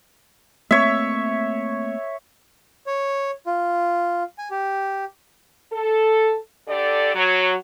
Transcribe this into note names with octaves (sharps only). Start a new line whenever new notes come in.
A3 A#3 C4 C#5 E5
C#5
F4
G#5
G4
A4
D3 G4 A4 D5
F#3